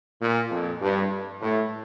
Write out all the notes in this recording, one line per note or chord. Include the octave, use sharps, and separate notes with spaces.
A#2
F2
G2
A2